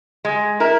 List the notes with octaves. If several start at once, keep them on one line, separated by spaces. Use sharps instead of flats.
G#3
E4 A#4